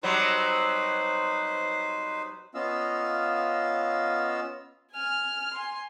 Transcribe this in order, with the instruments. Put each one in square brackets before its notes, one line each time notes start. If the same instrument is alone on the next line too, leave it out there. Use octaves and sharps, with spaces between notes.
[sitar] F#3 G3 C4 [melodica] D#4 B4 C5
[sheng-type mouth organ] B3 C#4 F4 D#5 F5 E6
[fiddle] G#5 F6
G#5 C6